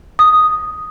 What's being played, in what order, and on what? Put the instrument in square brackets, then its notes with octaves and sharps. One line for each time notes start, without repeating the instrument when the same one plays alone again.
[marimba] D#6